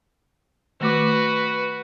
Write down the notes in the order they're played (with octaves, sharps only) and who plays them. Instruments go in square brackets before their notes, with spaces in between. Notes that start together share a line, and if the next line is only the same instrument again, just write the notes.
[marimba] D#3 A3 D6 [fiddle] F#4 B4